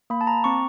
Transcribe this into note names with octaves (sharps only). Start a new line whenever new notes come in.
A#3 B5
A5
A#5
C4 C#6